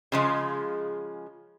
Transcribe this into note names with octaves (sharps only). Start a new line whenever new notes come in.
C#3 F3 G#3